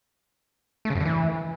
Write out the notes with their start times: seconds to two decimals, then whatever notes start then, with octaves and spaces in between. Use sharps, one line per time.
0.85 A3
0.90 C#3
0.95 F#2
1.00 D3
1.05 E3